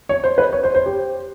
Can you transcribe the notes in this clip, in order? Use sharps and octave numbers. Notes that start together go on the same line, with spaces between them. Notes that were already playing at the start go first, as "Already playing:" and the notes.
C#5
C5
B4
C#5
C5
C5
G4